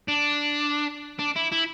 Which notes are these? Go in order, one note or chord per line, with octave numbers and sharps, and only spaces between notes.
D4
D4
E4
E4